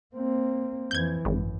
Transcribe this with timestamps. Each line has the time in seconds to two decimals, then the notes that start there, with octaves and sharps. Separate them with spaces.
0.15 A#3 C4
0.91 F2 E3 G6 G#6
1.25 G#1 F#2